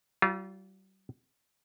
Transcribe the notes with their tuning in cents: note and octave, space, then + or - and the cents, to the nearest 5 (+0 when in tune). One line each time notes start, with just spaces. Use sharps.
G3 -40 F4 -5